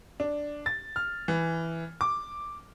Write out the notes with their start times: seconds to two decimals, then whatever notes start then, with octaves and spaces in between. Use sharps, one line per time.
0.20 D4
0.66 A6
0.96 F6
1.28 E3
2.01 D6